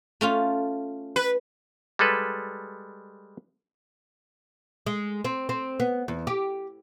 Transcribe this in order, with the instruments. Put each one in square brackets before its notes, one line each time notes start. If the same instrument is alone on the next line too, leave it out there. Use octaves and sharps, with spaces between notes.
[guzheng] A3 C#4 F4
[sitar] B4
[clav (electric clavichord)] G3 G#3 A4 B4
[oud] G#3
C4
C4
B3
E2
G4